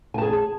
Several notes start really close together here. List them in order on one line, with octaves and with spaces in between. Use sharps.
G#5 A5 G#4